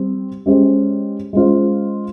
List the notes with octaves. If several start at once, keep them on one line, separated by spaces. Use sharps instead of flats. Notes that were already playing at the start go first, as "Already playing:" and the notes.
Already playing: G3 C4 C5
G#3 C#4 G4 C5
G#3 C#4 F4 C5